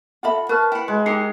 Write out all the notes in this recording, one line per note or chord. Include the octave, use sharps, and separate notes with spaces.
F4 A4 E5 F#5 B5
A#4 B4 A5 C#6 F6
E4 F#5 G5
G#3
D#4 G4 A#4 C5 C7 C#7